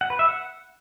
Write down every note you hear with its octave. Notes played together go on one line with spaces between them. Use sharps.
F#5
B4
E5
F#5